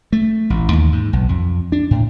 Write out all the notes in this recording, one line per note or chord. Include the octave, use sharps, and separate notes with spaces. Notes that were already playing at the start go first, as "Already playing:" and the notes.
A3
A1
D#2
G#2
B1
F2
D4
A2